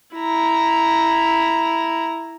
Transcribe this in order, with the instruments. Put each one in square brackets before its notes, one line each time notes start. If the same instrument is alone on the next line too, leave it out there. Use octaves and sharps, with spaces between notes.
[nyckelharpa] E4 A#5